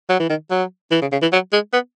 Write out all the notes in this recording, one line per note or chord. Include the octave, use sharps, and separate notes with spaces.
F#3
E3
D#3
F#3
E3
C#3
C#3
E3
F#3
G#3
B3